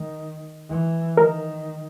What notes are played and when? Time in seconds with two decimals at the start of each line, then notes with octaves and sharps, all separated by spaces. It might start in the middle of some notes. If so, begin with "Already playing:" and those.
Already playing: D#3
0.69 E3
1.17 D#3 A#4